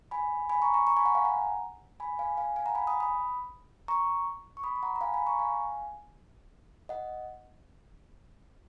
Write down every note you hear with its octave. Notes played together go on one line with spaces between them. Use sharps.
G#5 B5
G#5 B5
A#5 C#6
A#5 C#6
A#5 C#6
G#5 B5
F#5 A#5
F5 G#5
F#5 A#5
G#5 B5
F5 G#5
F5 G#5
F5 G#5
F#5 A#5
G#5 B5
B5 D#6
B5 D#6
A#5 C#6
C#6
B5 D#6
B5
F#5 A#5
A#5
F5 G#5
G#5 B5
A#5 C#6
F5 G#5
D#5 F#5